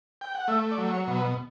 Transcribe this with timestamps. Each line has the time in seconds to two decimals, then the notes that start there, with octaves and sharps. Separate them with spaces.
0.21 G5
0.35 F#5
0.48 A3 E5
0.71 D5
0.78 F#3
0.94 C#5
1.07 B2
1.15 B4